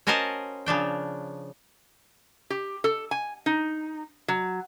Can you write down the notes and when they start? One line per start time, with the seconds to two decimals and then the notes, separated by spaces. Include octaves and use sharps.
0.07 C#4 F#4 A#4 C5 D#5 A5
0.66 C#3 F3 D4 G5
2.50 G4
2.84 A4
3.11 G#5
3.46 D#4
4.28 F#3